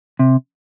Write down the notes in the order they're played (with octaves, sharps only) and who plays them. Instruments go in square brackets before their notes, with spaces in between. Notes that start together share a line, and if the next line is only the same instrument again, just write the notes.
[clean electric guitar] C3